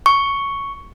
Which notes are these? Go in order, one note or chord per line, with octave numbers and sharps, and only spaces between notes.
C#6